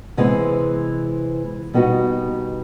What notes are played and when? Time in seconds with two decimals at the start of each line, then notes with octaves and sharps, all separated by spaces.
0.17 C3 E3 G#3 B3
1.74 B2 G3 B3 D#4 F#4